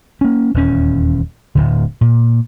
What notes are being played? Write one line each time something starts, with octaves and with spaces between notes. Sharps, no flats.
A#3 C#4
D#1 E2 C#4
D1 D2 D3
A#2